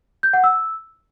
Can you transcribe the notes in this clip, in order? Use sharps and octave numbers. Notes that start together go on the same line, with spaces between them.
G6
F#5
E6